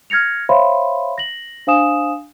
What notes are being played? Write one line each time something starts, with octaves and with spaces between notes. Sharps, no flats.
F6 G#6 A#6 C#7 F7
C5 C#5 E5 F5 B5 C6
A#6 F#7
D4 C5 F5 G#5 D#6 E7